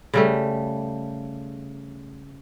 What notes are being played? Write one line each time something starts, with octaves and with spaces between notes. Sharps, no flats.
C#3 G3 A3